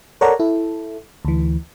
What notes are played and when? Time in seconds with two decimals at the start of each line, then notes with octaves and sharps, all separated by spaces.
0.21 A4 A#4 C#5 D5 F#5 A#5
0.40 E4 A4
1.25 D2 E3